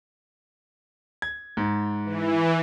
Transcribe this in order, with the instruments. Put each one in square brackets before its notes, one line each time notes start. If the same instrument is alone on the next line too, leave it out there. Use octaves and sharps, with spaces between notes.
[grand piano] G#6
G#2
[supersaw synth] E3